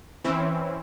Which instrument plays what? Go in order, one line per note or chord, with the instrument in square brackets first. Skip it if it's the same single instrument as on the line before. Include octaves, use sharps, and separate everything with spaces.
[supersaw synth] E3 C4 C#4 E4